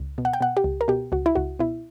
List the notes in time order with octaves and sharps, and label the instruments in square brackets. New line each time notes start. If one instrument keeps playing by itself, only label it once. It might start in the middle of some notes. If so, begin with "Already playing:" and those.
Already playing: [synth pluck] C#2
B2
F#5
G5
B2 F#5
G4
C#2
A#4
B2 G4
C#2 F#4
E4
C#2 F#4
B2 E4